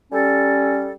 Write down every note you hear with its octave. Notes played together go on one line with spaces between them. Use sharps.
G3 C#4 A4